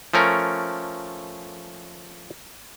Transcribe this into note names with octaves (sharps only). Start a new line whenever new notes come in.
F3 A3 C#4 A#4